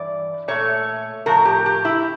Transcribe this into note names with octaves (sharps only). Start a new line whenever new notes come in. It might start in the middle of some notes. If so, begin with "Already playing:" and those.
Already playing: G2 E3 D5
A#2 A3 C#5
A2 F3 A3 A#4
G4
G4
E4